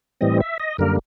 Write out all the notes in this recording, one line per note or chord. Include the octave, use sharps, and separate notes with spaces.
A2 E3 G3 C4 D#5
E5
D#5
F#2 D3 G3 A#3 A#4